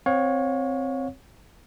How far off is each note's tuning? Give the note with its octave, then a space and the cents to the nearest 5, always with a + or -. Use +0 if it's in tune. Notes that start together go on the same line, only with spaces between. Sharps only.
C4 +0 C#5 +0 F5 +40